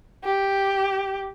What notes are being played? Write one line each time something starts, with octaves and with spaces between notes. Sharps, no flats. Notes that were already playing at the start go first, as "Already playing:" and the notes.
G4